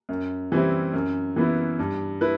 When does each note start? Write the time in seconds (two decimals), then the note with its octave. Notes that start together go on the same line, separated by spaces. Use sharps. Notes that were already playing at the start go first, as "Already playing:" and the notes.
0.09 F#2
0.52 E3 G3 C4 E4
0.93 F#2
1.36 E3 B3 E4
1.79 G2
2.21 E4 B4